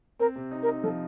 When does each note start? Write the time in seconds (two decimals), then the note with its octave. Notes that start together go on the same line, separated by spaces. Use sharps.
0.19 C4 A#4
0.36 C3
0.51 D#4
0.63 A#4
0.68 D#4
0.83 F3 A4